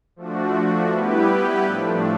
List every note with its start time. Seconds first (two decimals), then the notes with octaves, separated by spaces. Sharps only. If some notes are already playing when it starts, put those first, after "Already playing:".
0.16 F3 A3 D4 F#4
0.90 G3 B3 E4 G4 B4
1.65 A2 F3 A3 D4